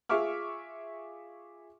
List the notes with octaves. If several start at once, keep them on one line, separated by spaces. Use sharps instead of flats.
F4 G#4 E5 C#6 D6 F6